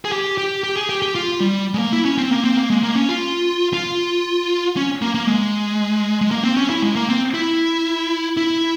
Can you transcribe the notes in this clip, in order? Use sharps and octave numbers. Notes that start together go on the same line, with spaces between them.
G#4
G4
G4
G4
G#4
G4
G4
F4
G3
G#3
A#3
E4
C#4
C4
A#3
C4
A#3
G#3
A#3
C#4
F4
F4
C#4
A#3
A#3
G#3
G#3
A#3
C4
C#4
E4
G#3
A#3
C4
E4
E4